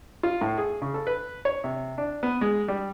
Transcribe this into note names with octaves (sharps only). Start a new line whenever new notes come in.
F4
A2
G#4
C#3
A4
B4
C#5
C3
D4
B3
G#3
G3